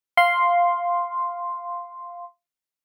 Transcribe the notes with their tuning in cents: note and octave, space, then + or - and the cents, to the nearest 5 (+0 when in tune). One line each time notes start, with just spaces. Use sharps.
F5 +0 C6 +0